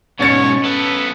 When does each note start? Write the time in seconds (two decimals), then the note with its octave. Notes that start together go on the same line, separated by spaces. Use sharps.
0.20 G#2 B2 C#4 C#5 A6 C#7
0.64 B3 A4 B4